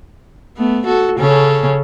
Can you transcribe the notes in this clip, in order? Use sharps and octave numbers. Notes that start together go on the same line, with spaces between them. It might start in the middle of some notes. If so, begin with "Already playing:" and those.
A3 B3
F#4 A4
C#3 C#4 A4